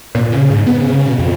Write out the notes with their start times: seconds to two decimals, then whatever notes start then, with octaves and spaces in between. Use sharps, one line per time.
0.15 A#2
0.32 C#3
0.50 G#2
0.66 B3
0.80 C#3
1.06 B2
1.19 F2